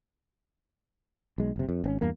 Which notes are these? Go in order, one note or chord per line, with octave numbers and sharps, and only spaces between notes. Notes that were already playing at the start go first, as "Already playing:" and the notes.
B1 G#3
F#1 C3
F2
G#1 C4 C#4
E2 G2 A#3